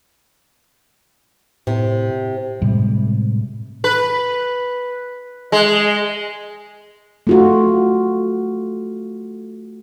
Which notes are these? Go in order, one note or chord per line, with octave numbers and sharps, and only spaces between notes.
A2 C3
A2 C3 G3 G#3
B4
G#3
A3 F4 F#4